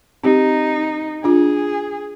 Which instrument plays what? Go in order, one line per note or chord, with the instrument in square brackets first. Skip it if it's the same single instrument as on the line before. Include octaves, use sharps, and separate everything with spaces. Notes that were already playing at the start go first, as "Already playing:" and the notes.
[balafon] C4 G4 [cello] D#4
[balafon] D4 F4 [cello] G#4